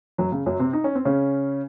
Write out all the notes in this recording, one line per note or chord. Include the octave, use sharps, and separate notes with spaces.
F#2 F#3
C#3
F#2 F#3
C3 C4
D#4
C#4
C4
C#3 C#4